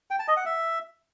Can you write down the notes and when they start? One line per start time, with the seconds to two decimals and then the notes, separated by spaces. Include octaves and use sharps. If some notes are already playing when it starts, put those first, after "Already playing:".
0.11 G5
0.19 A5
0.28 D#5
0.37 F#5
0.46 E5